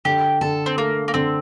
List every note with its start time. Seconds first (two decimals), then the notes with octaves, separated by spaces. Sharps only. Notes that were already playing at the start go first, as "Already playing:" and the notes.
0.05 D3 G4
0.41 D3 A4
0.66 C4
0.78 A3 A#3
1.08 A#3
1.14 D3 C4